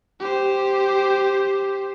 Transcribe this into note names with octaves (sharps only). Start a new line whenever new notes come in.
G4 C5